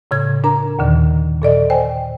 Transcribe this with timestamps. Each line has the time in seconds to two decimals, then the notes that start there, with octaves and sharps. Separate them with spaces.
0.11 A2 C#3 G#6
0.44 D4 A#4 A#5
0.79 D#2 A#2 D3 D#3
1.42 A#2 A4 D5 D#5
1.70 C5 G5 G#5